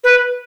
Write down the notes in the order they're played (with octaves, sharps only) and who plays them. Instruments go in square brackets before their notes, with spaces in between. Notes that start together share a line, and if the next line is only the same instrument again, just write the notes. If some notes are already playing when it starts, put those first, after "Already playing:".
[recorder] B4